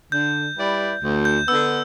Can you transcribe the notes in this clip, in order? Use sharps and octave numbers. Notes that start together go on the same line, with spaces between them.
D3 G6
G3 E4 B4 D5
D2
G6
D3 B3 E6